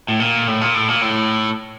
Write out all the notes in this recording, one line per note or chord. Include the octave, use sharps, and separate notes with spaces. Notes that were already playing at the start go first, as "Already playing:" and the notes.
A2
A#2
A2
A#2
A2
A#2
A2